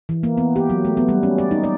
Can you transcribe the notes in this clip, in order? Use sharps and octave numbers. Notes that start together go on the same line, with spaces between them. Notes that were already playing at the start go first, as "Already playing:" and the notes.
E3
A#3
B3
G4
F#3
A3
B3
G3
C#4
D5
D#4
D5